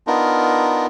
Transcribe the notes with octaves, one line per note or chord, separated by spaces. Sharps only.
B3 D4 D#4 F4 A#4